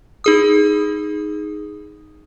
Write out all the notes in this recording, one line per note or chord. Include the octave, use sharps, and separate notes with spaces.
D#4 G#4 D#6